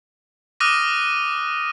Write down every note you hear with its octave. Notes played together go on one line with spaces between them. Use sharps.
D6 D#6 F6 F#6 A#6 D#7